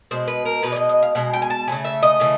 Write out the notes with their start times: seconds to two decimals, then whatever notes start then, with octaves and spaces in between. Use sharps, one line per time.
0.11 B2 G#3 C5
0.28 B4
0.45 A#4
0.63 B2 G#3 B4
0.72 D5
0.76 D#5
0.89 D#5
1.03 F5
1.15 B2 G#3 F#5
1.33 G5
1.42 G#5
1.50 A5
1.68 E3 A3 G#5
1.72 C#3
1.84 E5
2.02 D#5
2.20 C#3 E3 A3